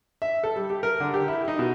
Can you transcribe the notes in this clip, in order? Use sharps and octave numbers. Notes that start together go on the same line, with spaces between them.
E5
A4
G3
G4
A#4
D3
G4
E4
D#4
B2